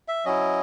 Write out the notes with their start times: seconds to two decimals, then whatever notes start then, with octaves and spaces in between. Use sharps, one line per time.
0.08 E5
0.25 F#3 C#4 E4 D#5